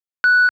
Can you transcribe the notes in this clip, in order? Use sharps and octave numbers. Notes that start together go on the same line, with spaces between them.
F#6